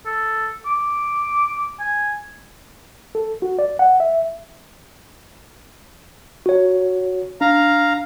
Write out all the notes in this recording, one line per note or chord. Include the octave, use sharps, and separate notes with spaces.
A4
D6
G#5
A4
F#4
D5
F#5
E5
F#4 C#5
D4 F5 A#5